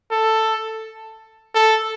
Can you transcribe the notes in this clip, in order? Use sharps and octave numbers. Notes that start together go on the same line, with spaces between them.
A4
A4